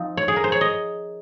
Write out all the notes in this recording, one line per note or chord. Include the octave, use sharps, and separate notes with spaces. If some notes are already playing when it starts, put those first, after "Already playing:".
Already playing: F3 C4 D#4
C#5
G#4
A#4
C5
C#5
D#5